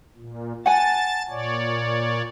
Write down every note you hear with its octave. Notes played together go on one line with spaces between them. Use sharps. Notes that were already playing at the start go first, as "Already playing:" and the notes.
A#2
F#5 G#5 A5 A6
A#2 C#5 D5